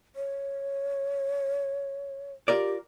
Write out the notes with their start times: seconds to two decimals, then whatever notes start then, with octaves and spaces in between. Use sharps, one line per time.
0.16 C#5
2.48 F4 G4 A#4 D5